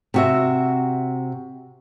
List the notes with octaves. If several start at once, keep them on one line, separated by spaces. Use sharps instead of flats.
C3 F#4 E5